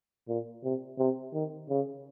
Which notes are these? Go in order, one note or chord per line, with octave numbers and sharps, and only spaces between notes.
A#2
C3
C3
D#3
C#3